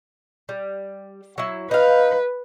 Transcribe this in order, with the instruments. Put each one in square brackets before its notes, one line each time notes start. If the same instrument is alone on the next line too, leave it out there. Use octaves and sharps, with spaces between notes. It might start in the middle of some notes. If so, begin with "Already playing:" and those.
[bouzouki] G3
F#3 E4
[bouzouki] D#4 F5 [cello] B4